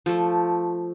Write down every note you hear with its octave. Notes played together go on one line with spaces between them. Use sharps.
F3 A3